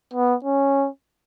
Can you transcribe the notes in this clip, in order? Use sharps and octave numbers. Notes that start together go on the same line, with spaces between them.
B3
C#4